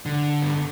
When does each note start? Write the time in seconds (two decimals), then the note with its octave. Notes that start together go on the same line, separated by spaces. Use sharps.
0.06 D3
0.42 G2